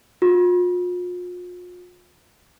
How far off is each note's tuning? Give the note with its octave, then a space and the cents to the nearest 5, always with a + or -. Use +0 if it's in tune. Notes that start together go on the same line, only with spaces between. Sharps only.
F4 +40